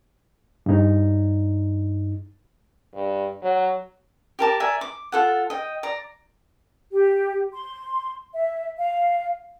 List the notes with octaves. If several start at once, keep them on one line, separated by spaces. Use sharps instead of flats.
G2 D#4
G2
F#3
G4 A#4 A5 D6
A#4 D5 E5 G#5
D6
F4 A4 F#5
D#5 G5
D5 A#5
G4
C6
E5
F5